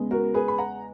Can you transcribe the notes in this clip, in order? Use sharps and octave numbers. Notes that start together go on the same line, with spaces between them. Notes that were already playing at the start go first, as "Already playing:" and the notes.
Already playing: E2 C#3 G#3 B3
F#4 A#4
G#4 B4
B5
F#5 A#5